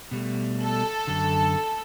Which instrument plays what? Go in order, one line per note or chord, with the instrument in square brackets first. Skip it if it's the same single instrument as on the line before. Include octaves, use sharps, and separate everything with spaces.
[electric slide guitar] B2 G3 A3
[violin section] A4
[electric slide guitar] F#2 D3